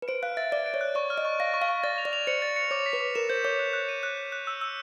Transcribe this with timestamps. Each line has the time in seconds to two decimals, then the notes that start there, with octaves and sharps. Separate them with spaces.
0.02 B4
0.08 C5 D7
0.23 F5 F#6
0.37 E5 A6
0.52 D5 A6
0.66 D7
0.74 C#5
0.81 F#6
0.95 D5 C#6
1.10 F6
1.18 D#5
1.25 C#6
1.40 F5 A#6
1.54 C#6
1.62 F5
1.69 C#6
1.83 D5 A6
1.98 F7
2.05 D5
2.13 F7
2.27 C5 C#7
2.42 A6
2.56 C#7
2.71 C#5 D6
2.86 B6
2.93 B4
3.01 D6
3.15 A#4 E7
3.29 C5 G6
3.45 C#5 D6
3.59 F#6
3.73 F#6
3.89 D#7
4.03 F#6
4.17 F#6
4.32 F#6
4.47 E6
4.61 E6